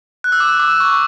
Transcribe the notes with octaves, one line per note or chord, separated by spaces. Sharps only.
F#6
E6
D6
D6
C#6